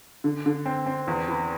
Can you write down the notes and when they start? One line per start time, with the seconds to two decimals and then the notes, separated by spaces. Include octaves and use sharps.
0.24 D3
0.46 D3
0.66 C4
0.86 C4
1.07 E2
1.28 E3